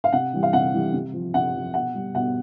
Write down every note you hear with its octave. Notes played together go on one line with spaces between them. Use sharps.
F5
C3 F#5
E3 G3
F5
C3 F#5
E3 G3
C3
F3
C3 F#5
F3
B2 F#5
G3
B2 F#5